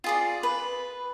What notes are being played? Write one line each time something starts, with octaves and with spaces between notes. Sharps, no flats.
F4 G#4 D5
B4